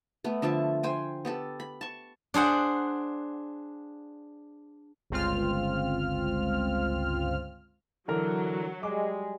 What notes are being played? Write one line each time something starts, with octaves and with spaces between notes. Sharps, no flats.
A3 B3
D3 F3 E5 A5
C5 G5 G#5
B3 G4 A4
B5
A5 C#6
D4 G#4 C5 F#5
G1 C#2 C4 F4 F6
D3 E3 F#3 A#4
G3 G#3 D6